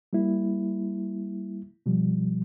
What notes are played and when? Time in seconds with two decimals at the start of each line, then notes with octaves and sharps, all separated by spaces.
0.13 G3 A#3 E4
1.86 B2 F3 G3